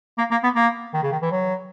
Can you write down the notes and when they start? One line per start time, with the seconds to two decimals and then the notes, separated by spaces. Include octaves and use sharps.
0.18 A#3
0.31 A#3
0.44 B3
0.56 A#3
0.94 D#3
1.03 C#3
1.12 D#3
1.22 E3
1.32 F#3